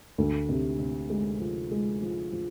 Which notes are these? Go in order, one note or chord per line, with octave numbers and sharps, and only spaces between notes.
D2
C3
C3
G#3
F3
G#3
F3
F3